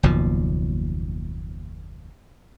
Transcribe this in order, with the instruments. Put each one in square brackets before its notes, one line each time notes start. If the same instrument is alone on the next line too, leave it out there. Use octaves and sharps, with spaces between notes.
[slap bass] F#1 D#2 B2 F3